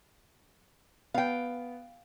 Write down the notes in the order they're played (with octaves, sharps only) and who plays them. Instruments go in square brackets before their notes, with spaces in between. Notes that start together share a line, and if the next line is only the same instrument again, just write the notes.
[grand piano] B3 [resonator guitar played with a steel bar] F5 G5